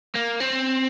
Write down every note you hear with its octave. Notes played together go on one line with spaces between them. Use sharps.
A#3
C4